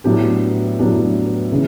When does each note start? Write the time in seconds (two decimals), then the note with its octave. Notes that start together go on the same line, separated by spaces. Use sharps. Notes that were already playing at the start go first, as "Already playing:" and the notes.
0.04 A2 F#3 B3 D4 G4
0.79 A2 F#3 B3 D4 G4
1.52 C#3 E3